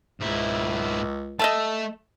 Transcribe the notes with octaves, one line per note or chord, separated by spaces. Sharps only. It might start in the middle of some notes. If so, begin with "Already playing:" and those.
C#2 G#2 E4
A3 D#5 E5 A5